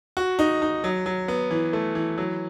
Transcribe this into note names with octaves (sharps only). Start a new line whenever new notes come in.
F#4
D#4
D#4
F#3
F#3
B3
E3
A3
E3
F#3